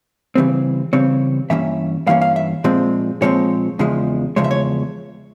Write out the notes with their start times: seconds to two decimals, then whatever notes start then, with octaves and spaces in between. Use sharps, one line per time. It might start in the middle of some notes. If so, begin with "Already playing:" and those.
0.35 C#3 E3 G3 C4
0.93 C#3 E3 G3 C4 C#5
1.50 G2 E3 A#3 C#4 E5
2.07 G2 E3 A#3 C#4 F5
2.21 F5
2.36 E5
2.64 A#2 F3 G#3 C4
3.22 A#2 F3 G#3 C4 C#5
3.79 E2 C#3 F3 G#3
4.36 E2 C#3 F3 G#3 C#5
4.44 E5
4.51 C#5